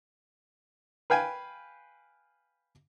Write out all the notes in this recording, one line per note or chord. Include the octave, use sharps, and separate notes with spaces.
B4 F5 G5 G#5